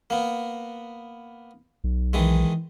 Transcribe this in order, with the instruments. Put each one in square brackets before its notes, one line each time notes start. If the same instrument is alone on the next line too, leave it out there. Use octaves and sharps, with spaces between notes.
[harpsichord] A#3 B3
[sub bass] B1
[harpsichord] D#3 E3 G#3